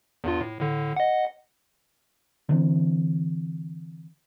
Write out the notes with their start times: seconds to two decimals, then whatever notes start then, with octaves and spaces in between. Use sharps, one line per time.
0.24 E2 G2 F4
0.41 A2
0.60 A2 D3
0.96 D#5 F#5
2.49 D3 E3 C4